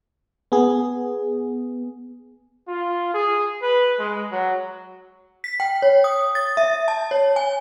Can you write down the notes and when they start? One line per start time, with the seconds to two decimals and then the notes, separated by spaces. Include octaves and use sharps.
0.52 B3 G#4
2.68 F4
3.14 G#4
3.62 B4
3.99 G#3
4.31 F#3
5.44 B6
5.60 G5
5.82 C#5
6.04 D#6
6.35 A6
6.57 E5
6.88 A5
7.11 C#5
7.36 G#5